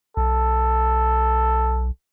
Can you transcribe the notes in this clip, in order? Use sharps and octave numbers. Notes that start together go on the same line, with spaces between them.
B1 A4